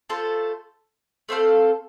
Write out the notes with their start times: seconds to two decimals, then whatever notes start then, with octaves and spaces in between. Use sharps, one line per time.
0.10 A3 F4 A4 C5
1.29 A3 C4 A4 F5